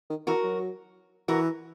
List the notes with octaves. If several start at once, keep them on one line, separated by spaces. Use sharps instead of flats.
D#3
E3 F#4 A#4
F#3
E3 F#4 A#4